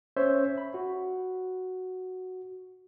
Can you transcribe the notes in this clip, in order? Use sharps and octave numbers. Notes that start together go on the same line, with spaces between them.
C#4 C5 C#5 E5 C6
B5
F#4